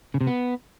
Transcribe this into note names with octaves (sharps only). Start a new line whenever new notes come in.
C#3
C3
B3